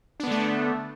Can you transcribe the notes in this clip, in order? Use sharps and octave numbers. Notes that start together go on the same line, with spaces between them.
D3 A3 B3 D4